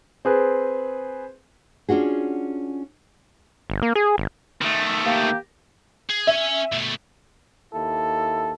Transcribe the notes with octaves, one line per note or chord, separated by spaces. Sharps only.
C4 G#4 B4
C#4 D4 F4 F#4 G#4
G1
A#3
G#4
G#1
D#3 A3
A#3 G4
G#4
C#4 E5 G#5
B2 A3
D#2 E4 A4